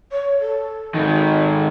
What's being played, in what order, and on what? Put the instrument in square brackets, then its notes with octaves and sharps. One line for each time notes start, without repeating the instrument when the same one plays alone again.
[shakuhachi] C#5
A4
[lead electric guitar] G#2 D#3